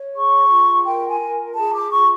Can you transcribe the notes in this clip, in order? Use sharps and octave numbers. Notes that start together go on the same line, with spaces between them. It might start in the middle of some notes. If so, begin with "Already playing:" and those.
Already playing: C#5
G#4 C#6
F4
A#4 G5
G#5
F4
G#4 A5
D6
F4 C#6